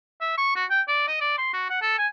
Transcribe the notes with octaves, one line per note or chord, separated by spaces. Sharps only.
E5
C#6
F#4
G5
D5
D#5
D5
C6
F#4
F#5
A4
G#5